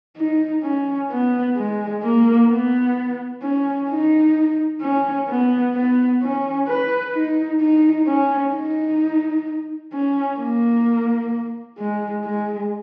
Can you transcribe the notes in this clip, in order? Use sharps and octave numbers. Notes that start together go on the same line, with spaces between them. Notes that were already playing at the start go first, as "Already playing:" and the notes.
D#4
C#4
B3
G#3
A#3
B3
C#4
D#4
C#4
B3
B3
C#4
B4
D#4
D#4
C#4
D#4
C#4
A#3
G#3
G#3